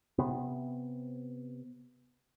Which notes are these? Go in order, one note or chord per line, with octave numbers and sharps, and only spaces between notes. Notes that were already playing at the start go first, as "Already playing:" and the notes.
C3 B3